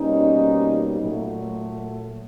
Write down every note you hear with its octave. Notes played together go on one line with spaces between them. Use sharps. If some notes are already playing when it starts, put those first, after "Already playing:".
Already playing: B2 G3 A#3 C#4 D#4
A#2 F#3 A3